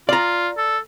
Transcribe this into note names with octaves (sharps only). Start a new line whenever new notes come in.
F4 D5 A#5
A4